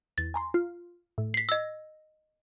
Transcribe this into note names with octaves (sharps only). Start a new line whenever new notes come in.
E2 A6
G#5 A#5 C6
F4
A2
B6 C7
D#5 E6 A#6